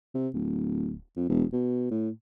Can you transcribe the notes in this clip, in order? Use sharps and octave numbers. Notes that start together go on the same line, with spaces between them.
C3
D1
F2
E1
B2
A2